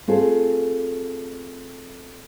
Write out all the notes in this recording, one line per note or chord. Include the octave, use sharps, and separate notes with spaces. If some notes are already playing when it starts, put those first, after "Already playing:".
A3 C4 F4 G#4 A4